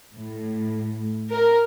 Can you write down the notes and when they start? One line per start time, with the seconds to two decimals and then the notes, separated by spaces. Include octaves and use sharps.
0.14 A2
1.31 A#4